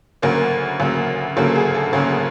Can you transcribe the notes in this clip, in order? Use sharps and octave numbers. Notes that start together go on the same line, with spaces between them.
D2 C#3 F#3 A#3 A#4
D2 C#3 F#3 A#3
D2 C#3 F#3 A#3 A4
G#4
A4
D2 C#3 F#3 A#3 C#5